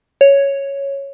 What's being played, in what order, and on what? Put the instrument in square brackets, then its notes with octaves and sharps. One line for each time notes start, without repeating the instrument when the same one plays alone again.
[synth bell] C#5